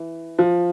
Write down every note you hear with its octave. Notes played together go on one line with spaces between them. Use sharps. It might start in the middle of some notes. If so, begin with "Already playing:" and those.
Already playing: E3
F3